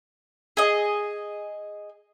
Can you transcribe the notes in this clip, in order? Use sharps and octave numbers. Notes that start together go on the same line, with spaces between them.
G#4 D#5